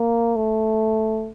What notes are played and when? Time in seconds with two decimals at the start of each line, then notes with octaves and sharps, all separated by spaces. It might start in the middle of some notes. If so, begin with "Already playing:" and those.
Already playing: A#3
0.36 A3